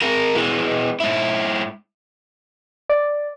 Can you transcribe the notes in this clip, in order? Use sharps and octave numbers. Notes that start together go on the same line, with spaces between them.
G#3 A#4
E3 G#3
G#2 E4
D5